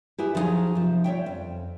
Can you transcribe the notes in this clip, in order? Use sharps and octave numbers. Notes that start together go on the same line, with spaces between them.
E4 G4 G#4 B4 E5
F3 F#3 B3 D#4 G4 G#4
C3 F3
G3 C#5 E5 G5
F2